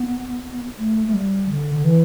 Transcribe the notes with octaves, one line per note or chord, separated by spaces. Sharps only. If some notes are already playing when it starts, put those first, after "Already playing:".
Already playing: B3
A3
A3
G3
D3
D3
E3